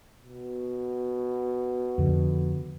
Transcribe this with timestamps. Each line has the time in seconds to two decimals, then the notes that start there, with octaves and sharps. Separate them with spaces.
0.23 B2
1.98 F2 D3